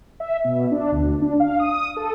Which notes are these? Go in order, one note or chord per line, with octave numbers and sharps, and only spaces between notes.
E5
B2
D4
D2
D4
F5
D#6
A4